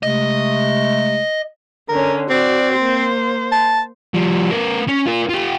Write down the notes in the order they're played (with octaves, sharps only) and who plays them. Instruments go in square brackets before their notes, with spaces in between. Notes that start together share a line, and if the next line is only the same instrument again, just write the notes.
[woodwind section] C3 G#3 A3 [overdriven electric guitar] D#5
[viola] D3 C#4 [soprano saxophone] A#4
[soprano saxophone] C4 [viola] F#4 D5
[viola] A#3 C5
[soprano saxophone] A5
[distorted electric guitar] F3 G3
B3 A#4
C#4
F4 A#4
F4 G4